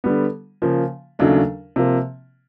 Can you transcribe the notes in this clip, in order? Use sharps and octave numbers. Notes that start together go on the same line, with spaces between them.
D3 G3 B3
C#3 F3 A#3
D#2 C#3 F#3 A3 D4
C3 F3 A#3